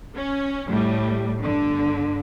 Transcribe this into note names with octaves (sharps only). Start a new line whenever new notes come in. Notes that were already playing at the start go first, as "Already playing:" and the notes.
C#4
A2 G3
G1 D3